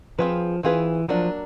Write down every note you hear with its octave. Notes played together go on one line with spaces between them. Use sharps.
F3 C4 F4 G#4 B4
E3 C4 F4 G#4 B4
F3 F#3 A#3 D4